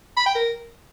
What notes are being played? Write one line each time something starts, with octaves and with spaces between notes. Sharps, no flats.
B5
G5
A#4